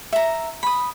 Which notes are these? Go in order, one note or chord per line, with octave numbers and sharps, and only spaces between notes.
E5 A#5
B5 D#6